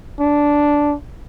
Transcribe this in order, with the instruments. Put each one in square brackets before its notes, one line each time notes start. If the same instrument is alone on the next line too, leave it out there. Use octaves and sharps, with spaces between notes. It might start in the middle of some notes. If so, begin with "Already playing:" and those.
[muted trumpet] D4